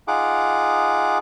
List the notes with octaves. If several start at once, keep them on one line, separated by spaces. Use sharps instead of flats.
D#4 F4 G#4 F#5 D6